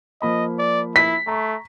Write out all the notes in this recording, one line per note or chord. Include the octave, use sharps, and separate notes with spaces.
F3 A#3 D#5 B5
D5
E4 B6
A3 A#5 C#6